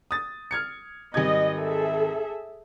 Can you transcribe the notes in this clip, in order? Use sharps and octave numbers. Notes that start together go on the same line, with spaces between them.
D#6 A6
F6 G#6 C#7
G#1 G3 D#5 G#6
G#4 A4 E5